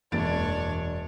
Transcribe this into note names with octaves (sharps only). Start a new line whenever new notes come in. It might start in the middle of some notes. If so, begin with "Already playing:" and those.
E1 F#2 E3 A#3 D4 C#5 A6 D7